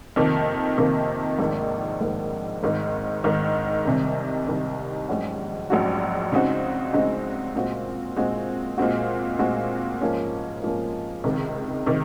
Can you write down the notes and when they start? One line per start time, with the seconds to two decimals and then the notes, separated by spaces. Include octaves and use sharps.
0.16 F2 C3 D#3 A#3
0.78 F2 C3 D#3 A#3
1.39 A#1 G#2 D#3 A#3
2.01 A#1 G#2 D#3 A#3
2.63 G#1 G#2 D#3
3.24 G#1 G#2 D#3
3.85 C2 C3 D#3
4.47 C2 C3 D#3
5.09 A#1 G#2 F#3 C#4 F#4
5.70 A#1 G#2 F#3 C#4 F#4
6.32 C#3 G#3 C4 D#4 F#4
6.93 C#3 G#3 C4 D#4 F#4
7.55 A#2 G#3 C4 F#4
8.16 A#2 G#3 C4 F#4
8.78 A#2 G#3 C4 F#4
9.39 A#2 G#3 C4 F#4
10.01 G#2 F3 A#3 C#4
10.63 G#2 F3 A#3 C#4
11.24 C#2 C3 D#3
11.86 C3 D#3